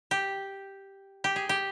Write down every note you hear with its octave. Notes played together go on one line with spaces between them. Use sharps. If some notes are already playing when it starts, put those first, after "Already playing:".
G4
G4
G#4
G4